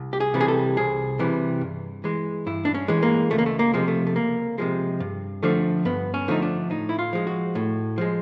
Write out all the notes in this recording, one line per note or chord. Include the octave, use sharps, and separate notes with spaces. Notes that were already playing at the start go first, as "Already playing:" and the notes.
Already playing: C2
G4
G#4
C3 E3 G3
G#4
A4
C2 G#4
C3 E3 G3
G2
E3 G#3
G2 E4
D4
C#4
E3 G#3
A#3
C#2 A3
A#3
A3
A#3
C3 F3 G#3
A3
A3
C#2 A#3
C3 F3 G#3
G2
D3 F3 A3
G2 B3
C#4
D3 F3 A3 D#4
D4
A2 D#4
E4
F4
F3 G#3
F#4
A2
F3 G#3